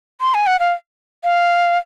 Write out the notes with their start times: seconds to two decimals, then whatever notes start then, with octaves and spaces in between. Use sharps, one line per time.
0.21 C6
0.34 G#5
0.47 F#5
0.60 F5
1.24 F5